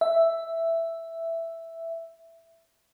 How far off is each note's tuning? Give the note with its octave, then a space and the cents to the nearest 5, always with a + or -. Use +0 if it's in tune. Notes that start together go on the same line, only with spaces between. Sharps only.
E5 +5